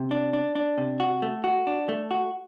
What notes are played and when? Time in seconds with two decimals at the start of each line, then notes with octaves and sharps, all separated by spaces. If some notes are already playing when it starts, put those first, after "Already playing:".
Already playing: C3
0.11 D4
0.33 D4
0.55 D4
0.78 C3
1.00 F#4
1.22 A3
1.44 F#4
1.67 D4
1.89 A3
2.11 F#4